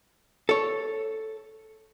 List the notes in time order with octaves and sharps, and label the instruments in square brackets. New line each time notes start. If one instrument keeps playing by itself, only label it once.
[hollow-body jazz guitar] A4 C#5